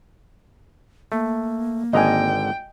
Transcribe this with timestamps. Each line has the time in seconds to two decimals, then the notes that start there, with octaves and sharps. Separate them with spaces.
1.12 A3 A#3
1.93 G#1 D3 D#5 G5 G#5 A#5